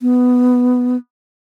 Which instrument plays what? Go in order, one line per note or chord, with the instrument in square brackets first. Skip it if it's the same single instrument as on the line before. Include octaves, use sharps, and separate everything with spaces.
[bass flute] B3